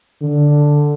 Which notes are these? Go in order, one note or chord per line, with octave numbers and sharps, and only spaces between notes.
D3